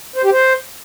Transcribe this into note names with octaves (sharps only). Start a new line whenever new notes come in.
C5
G4
C5